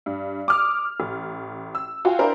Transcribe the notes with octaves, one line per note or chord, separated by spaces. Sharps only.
G2
D6 D#6 F6
A1
E6
F4 F#4 F5 G5 G#5
D4 E4 A#4 C5